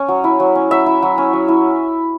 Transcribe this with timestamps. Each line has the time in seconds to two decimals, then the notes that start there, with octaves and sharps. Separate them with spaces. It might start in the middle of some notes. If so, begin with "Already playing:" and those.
Already playing: C#4
0.08 F#3
0.24 E4
0.40 F#3
0.56 C#4
0.71 F#3 E5
0.86 E4
1.02 F#3
1.18 C#4
1.33 F#3
1.48 E4